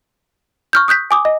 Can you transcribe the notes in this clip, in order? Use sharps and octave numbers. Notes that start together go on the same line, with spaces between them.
C#6 F6 G6
D#6 F#6 G6 B6
G#5 D6 D#6
D#5